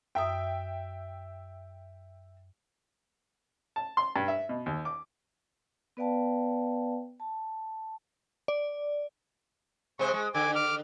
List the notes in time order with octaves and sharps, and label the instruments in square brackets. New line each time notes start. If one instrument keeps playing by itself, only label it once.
[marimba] F#2 D#6 [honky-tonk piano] E5 G5
[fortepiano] A5
C6
G2
E5
B2
D#2
D6
[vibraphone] B3 B4 D5 F5 G5 A5
A5
[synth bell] D5
[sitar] C3 G#3 C5 [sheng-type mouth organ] C#6
[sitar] G#3
[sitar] D3 [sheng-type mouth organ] G#5 D6
[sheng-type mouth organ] D6 F6